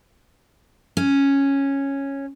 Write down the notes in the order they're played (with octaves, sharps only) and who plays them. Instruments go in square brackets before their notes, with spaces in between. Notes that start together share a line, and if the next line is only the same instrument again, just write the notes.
[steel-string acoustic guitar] C#4